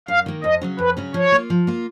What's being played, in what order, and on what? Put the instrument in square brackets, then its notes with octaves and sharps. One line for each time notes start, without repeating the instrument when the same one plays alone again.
[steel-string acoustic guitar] F#2 [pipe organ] F5
[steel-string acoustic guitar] D#3 A#3
[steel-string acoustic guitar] F2 [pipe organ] D#5
[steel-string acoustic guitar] C#3 F#3 C#4
[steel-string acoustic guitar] F2 [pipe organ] B4
[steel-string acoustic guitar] C#3 F#3 C#4
[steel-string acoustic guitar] F3 [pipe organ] C#5
[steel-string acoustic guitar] A#3 F4
F3
A#3 F4